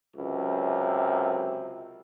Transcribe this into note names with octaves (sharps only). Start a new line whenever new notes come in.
C#2 F#2 C3